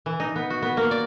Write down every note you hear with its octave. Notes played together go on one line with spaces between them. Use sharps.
E3
D#4
B3
F#4
B3
A#3
D5